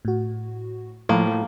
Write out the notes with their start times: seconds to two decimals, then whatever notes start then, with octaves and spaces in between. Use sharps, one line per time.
0.05 A2 F#4
1.09 A2 F3 A#3